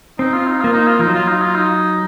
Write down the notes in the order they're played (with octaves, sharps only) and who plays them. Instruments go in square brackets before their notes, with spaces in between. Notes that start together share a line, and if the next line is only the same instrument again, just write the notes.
[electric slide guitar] C4 [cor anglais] D#4
[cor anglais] F4
D#4
[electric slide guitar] A#3 [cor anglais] F4
[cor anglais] D#4
F4
[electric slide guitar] F3 [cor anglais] D#4
[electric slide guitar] F#3
[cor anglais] F4
D#4
F4
D#4